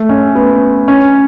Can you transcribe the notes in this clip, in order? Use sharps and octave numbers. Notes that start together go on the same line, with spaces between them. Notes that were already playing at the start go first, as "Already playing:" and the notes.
Already playing: A3
C#4
B3
C#4